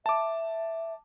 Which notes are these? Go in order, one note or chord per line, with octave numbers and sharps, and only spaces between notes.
E5 A5 D6